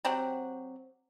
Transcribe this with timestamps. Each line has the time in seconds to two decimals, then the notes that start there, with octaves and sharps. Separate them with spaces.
0.05 F#3 C4 G4 F#5